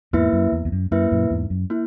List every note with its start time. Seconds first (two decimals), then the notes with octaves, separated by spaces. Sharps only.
0.13 E2 G#2 A#3 E4 B4 E5
0.33 F#2
0.52 E2
0.65 E2
0.72 F#2
0.91 F#2 A#3 E4 B4 E5
1.12 F#2 A#2
1.30 E2 G#2
1.50 F#2
1.70 A#3 E4